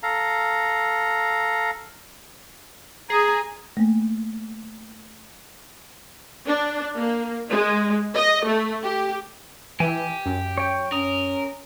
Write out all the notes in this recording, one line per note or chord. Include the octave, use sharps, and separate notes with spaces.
A4 F5 A#5
G#4 G#5 A#5 D#6
A3 A#3
D4
A#3
G#3
D#5
A3
G4
E3 G4 G#5
F#2
C#5 G5
C#4 A#4 D#6